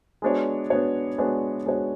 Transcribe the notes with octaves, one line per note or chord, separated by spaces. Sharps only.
G#3 B3 D4 F#4 C#5
G#3 B3 D4 F#4 C#5
G#3 B3 D4 F#4 C#5
G#3 B3 D4 F#4 C#5